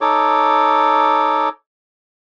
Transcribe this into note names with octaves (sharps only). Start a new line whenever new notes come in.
D#4 A4 C#5 D6